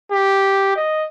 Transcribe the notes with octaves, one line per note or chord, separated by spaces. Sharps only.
G4
D#5